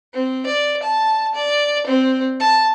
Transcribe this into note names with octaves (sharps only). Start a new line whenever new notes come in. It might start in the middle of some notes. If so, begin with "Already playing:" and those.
C4
D5
A5
D5
C4
A5